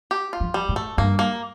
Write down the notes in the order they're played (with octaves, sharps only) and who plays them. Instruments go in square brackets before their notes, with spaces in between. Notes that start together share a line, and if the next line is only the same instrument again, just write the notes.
[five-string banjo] G4
F4
[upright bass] F3
[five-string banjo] G3
[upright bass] A2
[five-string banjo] A3
[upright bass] G2 [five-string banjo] A#3
[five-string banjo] A#3